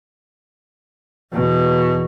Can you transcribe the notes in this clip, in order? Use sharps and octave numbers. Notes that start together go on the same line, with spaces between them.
E2 B2